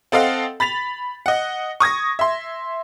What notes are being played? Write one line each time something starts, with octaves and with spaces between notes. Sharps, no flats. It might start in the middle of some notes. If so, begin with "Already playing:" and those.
C4 A4 D#5 F5 F#5
B5 A6 B6 F7
D#5 F#5
C#6 D#6 G#6 A#6
E5 C6